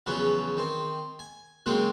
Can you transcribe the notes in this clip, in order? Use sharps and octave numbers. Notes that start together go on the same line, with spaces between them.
E2 C#3 F3 F#3 B3 C#4
D#3 C4
G#5
C#3 F#3 G#3 A#3 C4 D#4